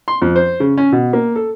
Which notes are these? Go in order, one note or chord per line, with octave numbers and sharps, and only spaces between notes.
C6
F2
C5
C#3
C#4
B2
A#3
A4